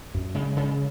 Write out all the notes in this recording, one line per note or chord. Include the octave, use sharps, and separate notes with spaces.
F#2
C#3 G#3
C#3